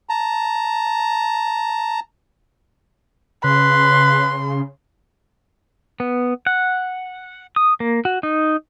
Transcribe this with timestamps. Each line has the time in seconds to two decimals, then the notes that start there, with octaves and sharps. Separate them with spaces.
0.09 A5 A#5
3.44 C#3 B4 C6
6.00 B3
6.47 F#5
7.56 D#6
7.80 A#3
8.05 F#4
8.23 D#4